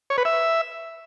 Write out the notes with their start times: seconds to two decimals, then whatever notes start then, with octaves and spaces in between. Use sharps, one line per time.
0.10 C#5
0.18 B4
0.25 E5